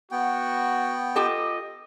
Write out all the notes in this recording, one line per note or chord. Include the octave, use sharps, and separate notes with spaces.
B3 F#4 G5
F4 G4 A4 D#5